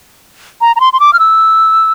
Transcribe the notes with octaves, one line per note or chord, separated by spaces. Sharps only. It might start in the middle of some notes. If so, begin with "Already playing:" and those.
A#5
A#5
C6
C6
D6
F6
E6